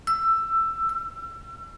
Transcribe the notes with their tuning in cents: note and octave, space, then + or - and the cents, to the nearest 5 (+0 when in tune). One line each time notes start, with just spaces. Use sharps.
E6 +15
E6 +35